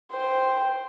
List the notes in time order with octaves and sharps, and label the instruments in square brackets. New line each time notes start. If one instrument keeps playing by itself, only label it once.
[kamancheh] C5 G5